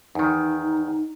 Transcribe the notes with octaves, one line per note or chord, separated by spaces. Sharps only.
E2 D#3 D#4